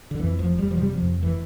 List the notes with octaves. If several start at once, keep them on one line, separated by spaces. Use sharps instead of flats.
D3
F2 E3
F1 F3
F1 G3
F3
C3 G3
F3
F2
F1 E3